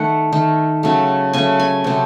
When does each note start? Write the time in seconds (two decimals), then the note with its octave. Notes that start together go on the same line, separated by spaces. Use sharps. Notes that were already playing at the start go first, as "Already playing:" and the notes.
Already playing: D#3 A3 F#5
0.33 D#3 A3
0.83 C#3 F#3 A3
1.33 C#3 F#3 A3 G#5
1.60 G#5
1.84 C3 F#3 A3